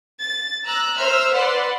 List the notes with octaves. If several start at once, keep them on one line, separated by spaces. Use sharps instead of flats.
A6
A#5 E6 F#6
C5 E5 E6 F6
B4 D5 F#5 C6